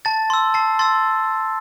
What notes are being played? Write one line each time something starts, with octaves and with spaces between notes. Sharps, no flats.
A5 A6
C6 E6
A5 C7
C6 E6 A6